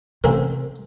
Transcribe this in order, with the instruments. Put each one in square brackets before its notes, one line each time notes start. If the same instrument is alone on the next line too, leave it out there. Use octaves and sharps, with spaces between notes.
[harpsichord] A1 C4 A#4 [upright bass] C3